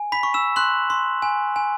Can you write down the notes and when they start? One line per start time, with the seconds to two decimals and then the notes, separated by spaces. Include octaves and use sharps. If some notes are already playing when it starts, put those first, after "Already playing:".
Already playing: G#5
0.12 B5 B6
0.23 C#6
0.34 E6 E7
0.56 C6 F#6 F#7
0.90 C6
1.22 G#5
1.56 G#5